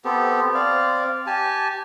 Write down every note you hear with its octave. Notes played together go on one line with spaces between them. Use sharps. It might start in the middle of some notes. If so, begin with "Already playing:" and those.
B3 C4 G4 A4
C4 D5 F5
G4 G#5 A5